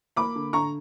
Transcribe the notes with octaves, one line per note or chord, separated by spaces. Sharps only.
A#3 B5 D6
D3
D3 A#5 C#6